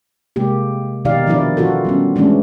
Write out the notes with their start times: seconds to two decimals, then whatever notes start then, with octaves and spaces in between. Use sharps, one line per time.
0.36 C3 G#3 A#3 G4
1.05 B2 D#3 D#4 G4 D5 F5
1.26 D#3 F3 D4 E4 D5
1.57 E3 C4 F4 F#4 A4
1.85 G3 B3 C#4
2.16 E3 G#3 A3 C#4 D4